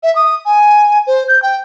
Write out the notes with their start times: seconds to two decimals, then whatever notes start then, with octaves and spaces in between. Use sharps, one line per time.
0.03 E5
0.16 D#6
0.46 G#5
1.07 C5
1.28 G6
1.42 G5